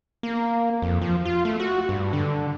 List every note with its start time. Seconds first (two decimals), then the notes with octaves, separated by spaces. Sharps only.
0.23 A#3
0.82 F2
1.01 F3
1.25 F4
1.45 A3
1.60 F#4
1.89 G2
2.13 D3